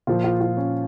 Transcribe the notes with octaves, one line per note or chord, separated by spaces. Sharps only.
A#2 F3 F4
F4
F4
C#4